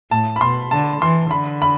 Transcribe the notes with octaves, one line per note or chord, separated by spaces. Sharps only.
A2 A5
B5
B2 C6
D3 A5
E3 C6
D3 B5
B5